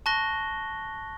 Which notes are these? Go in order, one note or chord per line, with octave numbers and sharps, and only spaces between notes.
A5 C#6 F#6 A#6 G7